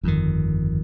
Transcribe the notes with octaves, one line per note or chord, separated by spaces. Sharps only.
G1 F2 D#3